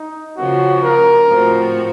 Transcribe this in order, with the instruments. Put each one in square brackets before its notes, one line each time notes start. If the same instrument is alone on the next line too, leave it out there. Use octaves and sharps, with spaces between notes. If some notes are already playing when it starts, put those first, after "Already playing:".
Already playing: [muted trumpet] D#4
[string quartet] C#3 F3 A#3 C#4 [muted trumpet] F#4
[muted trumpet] A#4
[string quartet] A2 F3 C4 F#4